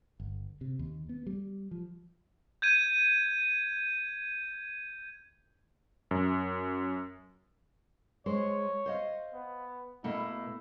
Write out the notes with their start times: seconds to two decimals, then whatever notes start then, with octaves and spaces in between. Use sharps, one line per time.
0.20 G1
0.61 C3
0.79 D#2
1.09 B3
1.27 G3
1.71 F3
2.62 G6 G#6 D#7
6.11 F#2
8.26 G#3 C5 C#5
8.86 C5 D#5 F5
9.34 B3
10.04 B2 A3 A#3 E4